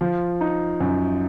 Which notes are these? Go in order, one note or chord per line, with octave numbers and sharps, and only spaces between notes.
F3
D#4
F#2